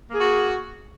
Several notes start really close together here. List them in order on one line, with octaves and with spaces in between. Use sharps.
A#3 G#4 F#4